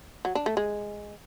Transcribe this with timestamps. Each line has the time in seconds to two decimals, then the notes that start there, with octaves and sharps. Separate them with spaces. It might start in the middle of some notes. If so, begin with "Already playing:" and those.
0.25 F#3
0.35 D4
0.46 A3
0.57 G#3